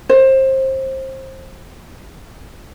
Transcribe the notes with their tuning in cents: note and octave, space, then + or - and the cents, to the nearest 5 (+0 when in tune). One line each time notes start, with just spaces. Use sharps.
C5 +25